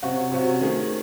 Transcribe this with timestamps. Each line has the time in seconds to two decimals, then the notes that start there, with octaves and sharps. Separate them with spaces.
0.02 C3 F#3 C#4 F#4
0.32 C3 F#3 C#4 F#4
0.60 D#3 A3 C#4 G#4